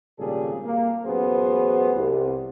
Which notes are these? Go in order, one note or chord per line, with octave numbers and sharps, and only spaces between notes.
G#1 A#2 C#3 G3 G#4 A4
A#3
A1 F#2 B3 F#4 G#4 C5
C2